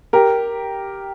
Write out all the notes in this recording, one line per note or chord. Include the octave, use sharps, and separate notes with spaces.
G4 A#4